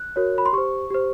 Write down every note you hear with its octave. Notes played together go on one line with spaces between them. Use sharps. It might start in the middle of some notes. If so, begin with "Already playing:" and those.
Already playing: F#6
F#4 A#4 C#5
B5
C6
G4 C5 C#6
G4 C5